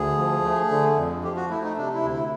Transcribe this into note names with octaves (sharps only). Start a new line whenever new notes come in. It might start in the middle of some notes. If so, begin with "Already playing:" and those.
Already playing: D2 G#4
F3
A3
D3
F2
F3 G4
F#4
A3 E4
D#4
C3 D4
E4
D2
E4